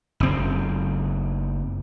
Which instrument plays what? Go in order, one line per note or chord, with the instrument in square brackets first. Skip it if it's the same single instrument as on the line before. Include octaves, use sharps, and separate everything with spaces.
[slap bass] F#1 C4